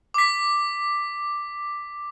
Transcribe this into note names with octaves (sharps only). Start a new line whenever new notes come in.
D6 B6